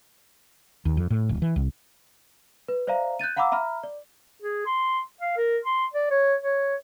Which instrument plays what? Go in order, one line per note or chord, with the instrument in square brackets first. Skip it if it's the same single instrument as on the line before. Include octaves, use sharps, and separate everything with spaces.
[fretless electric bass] D#2
F2
A2
D1
E3
C2
[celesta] B4
C5 D5 E5 F5 A#5
F#6 G6 A6 D#7
F5 F#5 A#5 B5 D6 E6
E5 A#5 B5 F6
D5
[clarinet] G#4
C6
F5
A#4
C6
D5
C#5
C#5